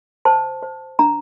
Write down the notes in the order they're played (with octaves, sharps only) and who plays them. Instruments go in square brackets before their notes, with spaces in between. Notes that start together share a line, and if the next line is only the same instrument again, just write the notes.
[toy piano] C5 A5
C5
D4 A#5